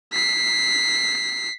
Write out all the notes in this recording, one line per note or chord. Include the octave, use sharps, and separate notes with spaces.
B6 C7